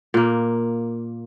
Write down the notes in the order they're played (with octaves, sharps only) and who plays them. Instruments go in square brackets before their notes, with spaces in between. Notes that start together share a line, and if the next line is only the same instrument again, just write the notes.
[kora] A#2 A#3